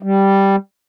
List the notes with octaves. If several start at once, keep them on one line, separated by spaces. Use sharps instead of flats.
G3